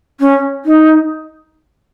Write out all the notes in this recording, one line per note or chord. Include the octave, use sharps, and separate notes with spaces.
C#4
D#4